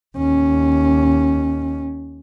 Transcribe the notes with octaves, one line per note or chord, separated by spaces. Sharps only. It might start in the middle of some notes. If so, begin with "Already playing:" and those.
D#2 C#4